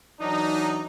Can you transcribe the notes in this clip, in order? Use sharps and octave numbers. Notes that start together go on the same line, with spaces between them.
E3 F#3 D4 D#4